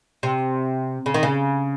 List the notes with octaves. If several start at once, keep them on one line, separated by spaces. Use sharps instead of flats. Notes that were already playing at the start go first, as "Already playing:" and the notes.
C3
C#3
D#3
C#3